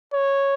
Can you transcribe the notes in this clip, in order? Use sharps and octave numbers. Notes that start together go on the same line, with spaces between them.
C#5